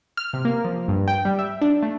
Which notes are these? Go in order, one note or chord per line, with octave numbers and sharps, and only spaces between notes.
F6
C3
A#3
F3
G2
G5
G3
E5
D4
A3